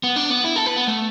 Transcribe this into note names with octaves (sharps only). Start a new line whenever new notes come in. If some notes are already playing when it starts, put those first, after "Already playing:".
B3
D4
B3
E4
A4
B4
B3
A3